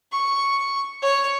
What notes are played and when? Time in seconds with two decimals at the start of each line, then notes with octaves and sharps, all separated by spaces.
0.12 C#6
1.02 C#5